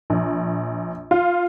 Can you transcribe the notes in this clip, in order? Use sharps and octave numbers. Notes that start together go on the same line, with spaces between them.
A#1
F4